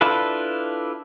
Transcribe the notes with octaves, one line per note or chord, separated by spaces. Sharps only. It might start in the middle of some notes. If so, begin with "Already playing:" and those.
D4 E4 F4 A4 B4